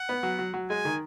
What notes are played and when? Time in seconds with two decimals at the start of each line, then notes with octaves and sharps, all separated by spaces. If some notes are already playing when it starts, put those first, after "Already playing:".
Already playing: F#5
0.09 B3
0.23 F#3
0.39 F#3
0.54 F#3
0.69 G#3 G#5
0.85 D#3